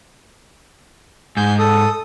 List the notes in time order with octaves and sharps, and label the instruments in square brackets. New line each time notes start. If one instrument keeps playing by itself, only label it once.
[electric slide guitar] G#2 [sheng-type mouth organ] G#5 G6
[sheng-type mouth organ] A4 D#6